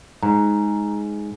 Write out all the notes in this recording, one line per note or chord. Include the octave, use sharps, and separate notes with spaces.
G#2 A#5